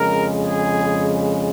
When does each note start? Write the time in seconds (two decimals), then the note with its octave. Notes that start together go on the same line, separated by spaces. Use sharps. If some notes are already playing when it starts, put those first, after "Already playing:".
Already playing: F2 C#3 G#3 A#4
0.40 G#4